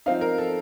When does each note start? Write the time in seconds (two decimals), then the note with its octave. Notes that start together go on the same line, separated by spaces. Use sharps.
0.06 F3 C4 D#4 F5
0.21 A#4
0.38 A4